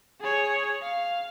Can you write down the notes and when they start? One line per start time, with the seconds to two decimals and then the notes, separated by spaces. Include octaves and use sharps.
0.21 G#4 C#5
0.82 F5